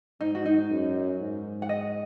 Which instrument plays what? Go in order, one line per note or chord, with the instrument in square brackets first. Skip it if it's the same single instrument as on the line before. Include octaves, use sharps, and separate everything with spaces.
[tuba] G#2 [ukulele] D#4
[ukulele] F#4
D#4
[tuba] F#2
G#2
[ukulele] F#5
D#5